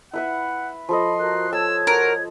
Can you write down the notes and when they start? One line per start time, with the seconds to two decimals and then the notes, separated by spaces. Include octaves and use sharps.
0.14 E4 B4 E5 F#5
0.89 F3 A4 D#5 B5 C6
1.19 F#4 A#4 F#6
1.53 A4 C#5 A5 E6 G#6
1.87 F#4 A#4